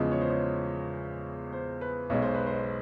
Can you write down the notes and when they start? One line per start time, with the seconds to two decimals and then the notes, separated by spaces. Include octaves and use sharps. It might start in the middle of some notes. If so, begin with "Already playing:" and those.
Already playing: E2 C#3 F3 G#3 B3 D#5
0.12 C#5
0.21 C5
0.30 C#5
1.53 C5
1.81 B4
2.10 B1 B2 G#3 C#5
2.22 C5
2.35 B4
2.47 C5